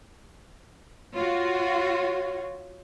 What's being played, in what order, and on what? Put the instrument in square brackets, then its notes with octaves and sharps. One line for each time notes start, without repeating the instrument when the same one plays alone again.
[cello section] F4 F#4 [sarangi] C#5